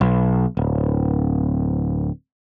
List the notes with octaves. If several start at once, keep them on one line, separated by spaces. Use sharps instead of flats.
B1
D1